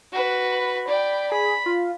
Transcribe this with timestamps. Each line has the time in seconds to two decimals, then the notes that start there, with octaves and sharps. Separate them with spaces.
0.12 F#4 B4
0.52 B5
0.88 D5 G5
1.32 G#4 B5
1.66 F4